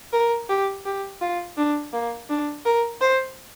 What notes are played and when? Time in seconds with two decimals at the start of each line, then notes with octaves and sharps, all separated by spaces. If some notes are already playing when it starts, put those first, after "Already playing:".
0.13 A#4
0.49 G4
0.85 G4
1.21 F4
1.57 D4
1.93 A#3
2.29 D4
2.65 A#4
3.01 C5